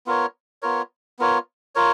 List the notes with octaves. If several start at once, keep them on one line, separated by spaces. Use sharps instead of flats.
B3 F4 A#4 C#5
B3 F4 A#4 C#5
B3 F4 A#4 C#5
F4 A#4 C#5